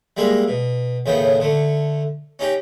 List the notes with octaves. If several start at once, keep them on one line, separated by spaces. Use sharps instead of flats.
G3 G#3 A#3 E5
B2
D#2 A2 C#3 B3 G5
D3 A3
C#4 D#4 G4